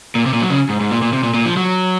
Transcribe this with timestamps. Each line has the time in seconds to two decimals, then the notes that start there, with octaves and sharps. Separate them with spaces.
0.15 A#2
0.26 C3
0.33 A#2
0.42 F#3
0.50 C#3
0.69 G#2
0.80 G#2
0.91 A#2
1.02 A#2
1.13 C3
1.23 A#2
1.34 A#2
1.45 F3
1.57 F#3